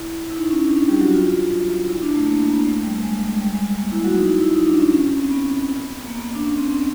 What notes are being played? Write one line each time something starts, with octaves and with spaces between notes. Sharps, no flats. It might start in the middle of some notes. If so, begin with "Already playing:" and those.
Already playing: E4
E4
D#4
C#4
D4
D4
G3 G4
F#3 F#4
F4
E4
D4
A3
A#3
A#3
B3
A3
G3
G#3
A3
G#3
G3
G#3
A#3
E4
F#3 F#4
D#4
E4
E4
D#4
D4
C#4
C#4
C#4
C4
B3
A#3
B3
D4
C#4
C4
C4